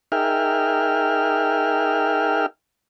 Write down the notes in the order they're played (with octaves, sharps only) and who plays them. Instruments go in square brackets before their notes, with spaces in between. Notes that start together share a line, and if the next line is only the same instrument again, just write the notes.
[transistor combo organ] D#4 G#4 A#4 E5 G5 F6